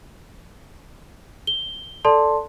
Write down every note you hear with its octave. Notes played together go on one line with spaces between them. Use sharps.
G7
A4 D5 A5 C6